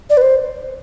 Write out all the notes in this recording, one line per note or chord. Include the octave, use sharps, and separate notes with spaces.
D5
B4
C5